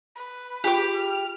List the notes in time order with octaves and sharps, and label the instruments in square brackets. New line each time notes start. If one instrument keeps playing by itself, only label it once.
[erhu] B4
[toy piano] F4 G#4 G5 [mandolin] G4 D6
[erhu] F6